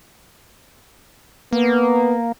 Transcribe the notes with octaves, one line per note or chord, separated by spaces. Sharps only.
A#3 B3